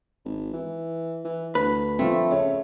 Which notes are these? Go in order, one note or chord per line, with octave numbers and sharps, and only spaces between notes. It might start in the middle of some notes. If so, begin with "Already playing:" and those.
G#1
E3
E3
D2 B4
F3 A3 C4
C#3 C#5